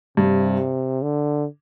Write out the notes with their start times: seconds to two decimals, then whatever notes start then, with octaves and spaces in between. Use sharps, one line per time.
0.17 G2 C3
1.02 D3